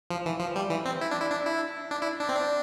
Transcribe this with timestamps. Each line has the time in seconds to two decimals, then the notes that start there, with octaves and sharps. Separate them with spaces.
0.11 F3
0.26 E3
0.40 F3
0.56 G3
0.70 E3
0.85 C4
1.01 E4
1.11 D4
1.20 E4
1.31 D4
1.47 E4
1.91 D4
2.02 E4
2.21 D4
2.29 C4
2.37 D4